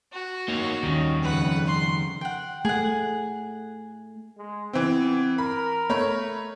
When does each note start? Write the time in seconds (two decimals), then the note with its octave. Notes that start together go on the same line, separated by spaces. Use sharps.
0.13 F#4
0.48 A#3 D#4 C#5
0.83 D#2 D#3 G3 C#4
1.23 F2 C#3 B4 F#5
1.67 C6
2.21 F#5 G5
2.65 A3 G#4 F#5
4.38 G#3
4.73 E3 B3 C4
5.38 A#4 B5
5.89 A3 C#5 B5